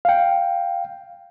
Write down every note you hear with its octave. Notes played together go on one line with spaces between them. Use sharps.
F5 G5